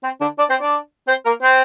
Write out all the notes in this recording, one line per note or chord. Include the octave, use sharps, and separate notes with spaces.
C4
D3 D4
D4 D5
C4 C5
D4 D5
C4 C5
A#3 A#4
C4 C5